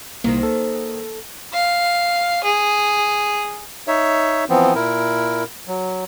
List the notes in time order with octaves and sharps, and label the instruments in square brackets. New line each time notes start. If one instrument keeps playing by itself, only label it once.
[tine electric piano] C2 [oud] D#3 C4 [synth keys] A#3
[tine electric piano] A4
[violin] F5
G#4
[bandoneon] D#4 C#5 E5
E3 F3 B3 C4
A#2 E4 A#4
F#3